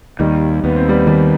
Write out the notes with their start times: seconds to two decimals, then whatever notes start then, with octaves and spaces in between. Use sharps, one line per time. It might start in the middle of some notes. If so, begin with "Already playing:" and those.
0.20 D#2 D#3 G3
0.64 D#2 B3
0.76 C4
0.89 G3 B3
1.07 D#3 G3 B3